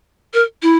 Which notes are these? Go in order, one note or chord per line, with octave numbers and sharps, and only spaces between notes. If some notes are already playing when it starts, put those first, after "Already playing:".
A#4
E4